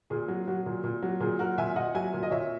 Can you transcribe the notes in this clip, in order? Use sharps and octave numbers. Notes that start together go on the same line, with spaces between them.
A#2 G#4
F#3
F#3
A#2
A#2
F#3
A#2 G#4
F#3 F#4 A#4
A#2 E5 G#5
A#2 D#5 F#5
F#3 E5 G#5
A#2
D#5
A#2 C#5 E5